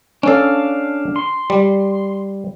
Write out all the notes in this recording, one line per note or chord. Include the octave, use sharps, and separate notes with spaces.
C#4 D4 A4 F5
C6
G3